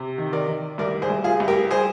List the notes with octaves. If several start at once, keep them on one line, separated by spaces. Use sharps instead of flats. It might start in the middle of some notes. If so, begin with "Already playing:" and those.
Already playing: C3
D#3
A#4 D5
D#3
C2 A#4 D5
G#4 C5
C2
F4 G#4
C2
G4 A#4
G#4 C5